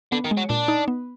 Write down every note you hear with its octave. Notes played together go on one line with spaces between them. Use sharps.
D3 B3
D#3
G#3
F#3
A#2 D4
D#4
B3